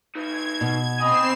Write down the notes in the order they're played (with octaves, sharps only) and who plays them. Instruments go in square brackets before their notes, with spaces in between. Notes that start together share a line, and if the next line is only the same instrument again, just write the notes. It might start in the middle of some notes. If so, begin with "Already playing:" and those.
[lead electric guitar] D#4 B4 [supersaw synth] G#6
[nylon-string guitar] B2
[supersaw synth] C4 C7 E7 [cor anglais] D#5 [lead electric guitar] G#5 B5